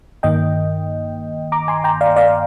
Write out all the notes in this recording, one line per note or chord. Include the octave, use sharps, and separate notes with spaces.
G2 D#3 A#3 D#5 G5
A#5 D6
G#5 C6
G5 A#5
D5 F5
D5 F5